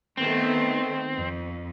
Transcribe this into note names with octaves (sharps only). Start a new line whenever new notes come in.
D#3 A3 B3 C4
F2